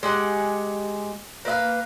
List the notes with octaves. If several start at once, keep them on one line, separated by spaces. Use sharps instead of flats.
G#3 G4 F#5
A#3 B4 E5 F5